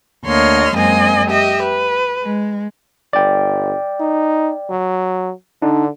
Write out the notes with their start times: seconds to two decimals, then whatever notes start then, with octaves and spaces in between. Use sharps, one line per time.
0.25 D2 A#3 C#5 D#5 C6 F6
0.75 F#2 G#3 A#3 C4 D#5 G#5
1.27 G4 D#5 E5
1.61 B4
2.23 G#3
3.13 G1 D5 G5
4.00 D#4
4.70 F#3
5.62 D3 D4 D#4